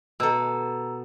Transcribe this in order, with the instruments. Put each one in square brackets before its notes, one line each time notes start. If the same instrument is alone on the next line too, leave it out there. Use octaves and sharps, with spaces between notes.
[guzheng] B2 A4 [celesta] A#5 E6